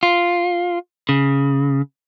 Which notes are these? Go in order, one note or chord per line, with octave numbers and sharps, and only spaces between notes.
F4
C#3